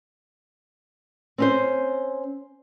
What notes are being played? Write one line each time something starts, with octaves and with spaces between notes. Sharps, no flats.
C4 C#4 C5